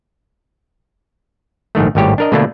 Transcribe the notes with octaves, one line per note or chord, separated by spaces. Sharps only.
A#1 G#2 D#3 A3
G#1 A2 G3 G4 C#5
D4 A#4 D#5
B2 D3 A3 A#3 D4